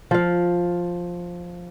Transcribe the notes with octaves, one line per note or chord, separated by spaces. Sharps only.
F3 F5